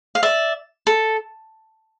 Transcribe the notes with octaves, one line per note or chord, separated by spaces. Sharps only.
F5
D5 E5
A4